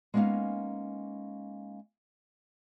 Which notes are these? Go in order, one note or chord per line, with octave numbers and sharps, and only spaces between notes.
G#3 A#3 B3 C#4 D#4 F5